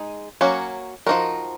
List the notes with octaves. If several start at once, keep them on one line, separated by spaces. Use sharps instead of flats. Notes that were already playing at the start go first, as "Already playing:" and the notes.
Already playing: G#3 D#4 G#4
F#3 A#3 C#4 F#4
F3 A#3 D#4 F#4 A#4